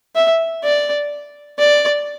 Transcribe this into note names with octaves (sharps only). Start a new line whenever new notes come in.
E5
D5
D5